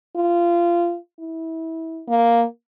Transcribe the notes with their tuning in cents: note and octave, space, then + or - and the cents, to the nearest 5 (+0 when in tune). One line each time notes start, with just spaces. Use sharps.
F4 -20
E4 -25
A#3 +0